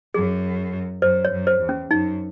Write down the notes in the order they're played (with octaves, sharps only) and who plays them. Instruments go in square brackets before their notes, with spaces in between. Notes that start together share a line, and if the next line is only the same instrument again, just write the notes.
[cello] F#2 [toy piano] G#4
[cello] F#2 [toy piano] C5
[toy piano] C#5
[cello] F#2
[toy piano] C5
[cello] E2
[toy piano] C#4
[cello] F#2 [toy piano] D#4